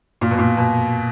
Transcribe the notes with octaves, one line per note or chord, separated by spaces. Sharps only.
A#2
B2
A#2
B2